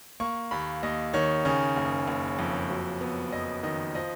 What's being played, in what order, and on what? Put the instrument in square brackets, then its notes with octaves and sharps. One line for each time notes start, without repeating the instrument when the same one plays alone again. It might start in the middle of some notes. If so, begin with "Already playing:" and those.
[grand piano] A#3 C#6
D#2 B5
D#2 D#5
D#3 C#5
C#3 C#5
F#1
F#1
F2
F#3
B3
F2 D#5
D#3 D#5
F3 D#5